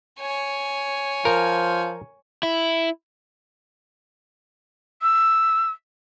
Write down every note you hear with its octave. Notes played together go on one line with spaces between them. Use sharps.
C#5 G#5
F3 A#4
E4
E6